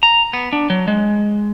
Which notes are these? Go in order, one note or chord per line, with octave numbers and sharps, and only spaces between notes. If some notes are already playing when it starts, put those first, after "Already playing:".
A#5
B3
D4
F#3
G#3